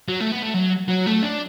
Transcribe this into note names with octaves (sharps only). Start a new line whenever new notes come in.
F#3
A3
B3
A3
F#3
F#3
A3
D4